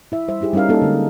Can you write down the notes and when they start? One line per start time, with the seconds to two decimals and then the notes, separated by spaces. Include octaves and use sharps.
0.12 E4 E5
0.28 G3 C5 E5
0.41 D#4 E4 G4 G#4
0.53 G3 C#4 D#4 A#4 F5
0.69 A#3 C#4 D#4 A4
0.82 D3 G#3